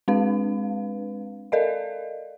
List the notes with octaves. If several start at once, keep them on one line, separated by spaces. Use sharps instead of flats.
G#3 C4 D4 B4 F5
A4 A#4 D5 D#5 F5